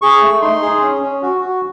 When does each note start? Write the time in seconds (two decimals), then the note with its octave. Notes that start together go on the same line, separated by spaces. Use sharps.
0.02 G#4 C#6
0.22 A3
0.42 D#4 C6
0.62 G#4
0.82 C#4
1.02 C#4
1.22 F#4
1.41 F#4